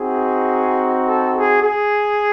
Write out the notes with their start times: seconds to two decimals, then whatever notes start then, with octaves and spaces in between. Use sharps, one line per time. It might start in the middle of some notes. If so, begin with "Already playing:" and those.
Already playing: C4 D#4 F#4 G#4
1.06 A4
1.35 G#4
1.63 G#4